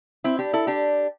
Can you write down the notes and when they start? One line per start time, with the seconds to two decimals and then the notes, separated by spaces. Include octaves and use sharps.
0.24 C4 E4
0.39 D4 G4
0.53 E4 A4
0.67 D4 G4